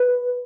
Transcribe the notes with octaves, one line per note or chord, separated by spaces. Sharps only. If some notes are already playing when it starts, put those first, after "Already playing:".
Already playing: B4